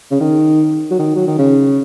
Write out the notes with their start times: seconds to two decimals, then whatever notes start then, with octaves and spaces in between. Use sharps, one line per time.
0.11 C#3
0.20 D#3
0.91 F#3
0.99 D#3
1.15 F#3
1.27 D#3
1.39 C#3